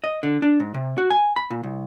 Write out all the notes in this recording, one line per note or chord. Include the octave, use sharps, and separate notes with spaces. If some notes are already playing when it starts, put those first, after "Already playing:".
D#5
D3
D4
G#2
C3
F#4
G#5
B5
A#2
C2